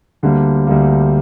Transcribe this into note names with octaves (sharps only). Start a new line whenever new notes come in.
D2 D3 G3 A#3
D2 D3 G3 A#3